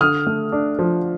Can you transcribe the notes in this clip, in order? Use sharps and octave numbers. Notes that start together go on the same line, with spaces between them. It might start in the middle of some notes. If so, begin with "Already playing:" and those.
D3 D#6 F6
A3
D4
F3